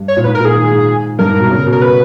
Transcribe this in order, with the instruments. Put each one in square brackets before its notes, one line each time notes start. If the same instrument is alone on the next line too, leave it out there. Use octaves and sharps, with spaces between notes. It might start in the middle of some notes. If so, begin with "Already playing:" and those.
Already playing: [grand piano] G2
[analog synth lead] C#5
[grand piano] A#2
[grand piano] G#2 [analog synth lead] B4
[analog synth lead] A#4
[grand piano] A#2
[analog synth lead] G#4
[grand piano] D#3
G#2
[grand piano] G2 [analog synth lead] A#4
[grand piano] G#2
B2
C#3
B2
[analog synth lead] A#4
B4